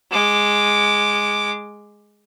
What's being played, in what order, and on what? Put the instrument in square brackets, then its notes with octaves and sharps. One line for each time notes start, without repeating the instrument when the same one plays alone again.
[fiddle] G#3 D6